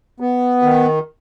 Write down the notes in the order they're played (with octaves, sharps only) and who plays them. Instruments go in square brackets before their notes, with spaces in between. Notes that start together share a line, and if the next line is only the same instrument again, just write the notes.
[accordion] B3
D#3